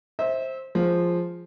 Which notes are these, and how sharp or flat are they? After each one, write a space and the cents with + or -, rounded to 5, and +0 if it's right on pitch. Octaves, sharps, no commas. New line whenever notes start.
C5 +15 E5 -20
F3 +0 G#3 -5 C5 +0